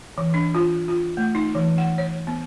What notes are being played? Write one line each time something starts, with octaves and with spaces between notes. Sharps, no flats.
E3
D4
F4
F4
A3
D#4
E3
F#5
C#5
B3